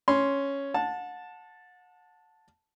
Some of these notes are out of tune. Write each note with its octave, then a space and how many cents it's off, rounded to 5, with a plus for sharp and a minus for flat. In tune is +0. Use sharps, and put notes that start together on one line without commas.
C#4 +0 C6 +0
F#5 -35 A5 +0